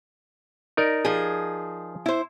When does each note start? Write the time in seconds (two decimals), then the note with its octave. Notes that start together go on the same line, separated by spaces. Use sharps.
0.77 D#4 A#4 D5
1.05 F3 G#4
2.06 E4 C5